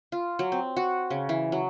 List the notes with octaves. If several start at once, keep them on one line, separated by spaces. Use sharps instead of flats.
F4
F#3
C4
F#4
C#3
E3
F#3